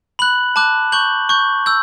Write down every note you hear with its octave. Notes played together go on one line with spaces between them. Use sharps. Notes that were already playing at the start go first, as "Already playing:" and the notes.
B5 F#6 F#7
A5 D6 F#6
C#6 G6 F#7
C#6 G6
E6 G6